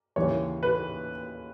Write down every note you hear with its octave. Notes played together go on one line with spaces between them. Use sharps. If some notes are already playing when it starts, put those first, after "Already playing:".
D#2 C#3 E3 C#5
B4